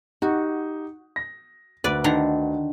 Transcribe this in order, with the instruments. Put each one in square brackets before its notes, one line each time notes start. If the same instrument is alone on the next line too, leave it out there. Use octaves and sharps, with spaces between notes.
[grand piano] D#4 G4 F#5 [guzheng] F#4
[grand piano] A#6
[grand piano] D2 [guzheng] B4 D5
[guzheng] D3 D#3 A#5